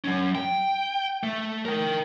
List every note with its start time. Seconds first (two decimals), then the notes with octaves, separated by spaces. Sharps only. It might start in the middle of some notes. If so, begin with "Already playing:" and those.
0.05 F#3 C#4
0.35 G5
1.23 A3
1.65 A#4 G5